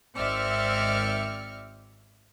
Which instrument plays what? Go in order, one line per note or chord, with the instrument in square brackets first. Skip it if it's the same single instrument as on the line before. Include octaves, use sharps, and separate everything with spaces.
[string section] G#1 C4 D5 E5 F6 C#7